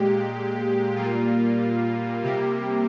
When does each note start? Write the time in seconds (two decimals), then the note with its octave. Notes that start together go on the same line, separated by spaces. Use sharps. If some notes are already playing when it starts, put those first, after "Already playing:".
Already playing: A#2 G#3 G4
0.96 A#2 G3 A#3 F4
2.23 C3 G3 A#3 G4